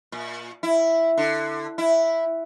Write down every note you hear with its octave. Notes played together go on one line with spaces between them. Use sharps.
A#2
E4
D3
E4